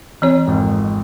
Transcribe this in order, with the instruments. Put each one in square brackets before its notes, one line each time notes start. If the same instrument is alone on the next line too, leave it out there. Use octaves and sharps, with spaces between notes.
[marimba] E3 C4 C#5
[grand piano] G#1 F2 G#2